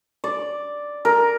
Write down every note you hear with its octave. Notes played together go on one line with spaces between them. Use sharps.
D5
A#4